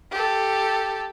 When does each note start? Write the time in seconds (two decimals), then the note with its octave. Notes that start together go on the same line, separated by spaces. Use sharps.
0.11 G4 A4